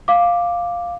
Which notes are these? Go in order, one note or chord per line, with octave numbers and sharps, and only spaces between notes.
F5 D6